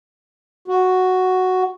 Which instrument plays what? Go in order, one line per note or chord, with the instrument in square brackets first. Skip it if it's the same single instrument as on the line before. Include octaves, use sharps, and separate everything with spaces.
[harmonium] F#4